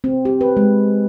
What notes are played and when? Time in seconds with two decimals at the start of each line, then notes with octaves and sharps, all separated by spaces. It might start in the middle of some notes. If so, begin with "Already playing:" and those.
0.04 C4
0.25 G4
0.41 B4
0.57 G#3